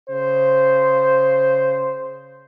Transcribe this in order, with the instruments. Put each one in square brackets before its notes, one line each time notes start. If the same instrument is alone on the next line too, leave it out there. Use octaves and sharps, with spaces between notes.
[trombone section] C#3 C5